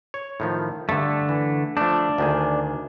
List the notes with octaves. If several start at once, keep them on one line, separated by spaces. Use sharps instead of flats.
C#5
A2 D#3 F3
G2 D3 A3
E3
F3 A3 D4
D2 D#3 G#4